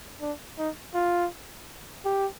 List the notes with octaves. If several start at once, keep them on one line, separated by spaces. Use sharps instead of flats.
D4
D#4
F4
G4